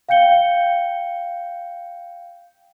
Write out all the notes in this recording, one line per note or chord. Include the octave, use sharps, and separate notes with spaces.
F5 G5 G6 C#7 G7